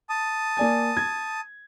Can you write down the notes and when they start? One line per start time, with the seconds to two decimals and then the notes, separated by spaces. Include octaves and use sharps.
0.09 A5 D#6
0.57 A#3 D5 G#5
0.97 G#6